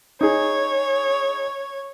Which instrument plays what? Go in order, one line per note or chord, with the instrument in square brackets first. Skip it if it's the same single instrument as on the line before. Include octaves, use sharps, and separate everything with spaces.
[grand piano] D#4 G#4 [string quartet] C#5